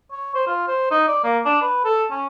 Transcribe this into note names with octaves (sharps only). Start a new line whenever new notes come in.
C#5
C5
F4
C5
D#4
D5
A#3
D4
B4
A4
C#4